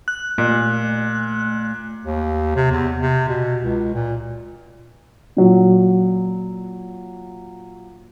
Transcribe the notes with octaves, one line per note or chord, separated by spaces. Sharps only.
F#6
A#2 A3
D#2
C3
E2
C3
B2
C#2
A#2
A#2 F#3